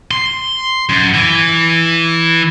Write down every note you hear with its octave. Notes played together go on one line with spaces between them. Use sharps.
C6
F#2
E3